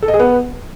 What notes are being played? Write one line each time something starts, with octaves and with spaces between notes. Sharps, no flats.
A4
D#5
G#4
B3